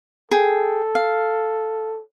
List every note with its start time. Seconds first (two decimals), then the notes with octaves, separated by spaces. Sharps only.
0.31 G#4 A4 G5
0.95 F5